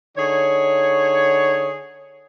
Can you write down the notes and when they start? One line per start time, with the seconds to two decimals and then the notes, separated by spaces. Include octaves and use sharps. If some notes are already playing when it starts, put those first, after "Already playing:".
0.18 D3 D#4 G#4 C#5